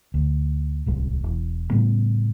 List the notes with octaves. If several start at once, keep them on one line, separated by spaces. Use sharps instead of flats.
D2
D1 C2 G#3
E1
A2 C#3 G3 B3